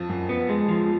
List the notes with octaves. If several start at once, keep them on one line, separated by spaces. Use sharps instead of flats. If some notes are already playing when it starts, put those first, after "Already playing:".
Already playing: F2 F3
F#2
B3
G#3
F3